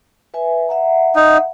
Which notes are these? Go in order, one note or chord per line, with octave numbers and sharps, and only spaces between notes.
B4 E5 G#5
E5 F#5 A#5
D#4